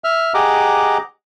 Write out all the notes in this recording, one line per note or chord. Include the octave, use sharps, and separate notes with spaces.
E5 F6
G4 G#4 D#5 F#5 A#5 D6